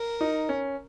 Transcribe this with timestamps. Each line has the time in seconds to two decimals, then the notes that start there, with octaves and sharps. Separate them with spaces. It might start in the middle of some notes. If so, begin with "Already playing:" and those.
Already playing: A#4
0.21 D#4
0.49 C#4